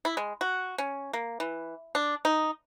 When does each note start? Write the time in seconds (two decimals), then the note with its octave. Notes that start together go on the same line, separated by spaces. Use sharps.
0.05 E4
0.17 G#3
0.41 F#4
0.78 C#4
1.13 A#3
1.40 E3
1.95 D4
2.25 D#4